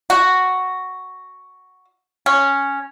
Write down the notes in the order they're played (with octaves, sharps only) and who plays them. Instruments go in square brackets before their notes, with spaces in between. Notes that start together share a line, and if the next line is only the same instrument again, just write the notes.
[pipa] F#4
C#4